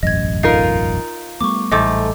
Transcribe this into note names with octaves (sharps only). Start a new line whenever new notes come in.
E1 A1 F#2 D#5 G#6
D#4 F4 A#4 F5
G3 A3 B3 C#6 D6
A1 G#2 G3 A3 D#5 D6 G6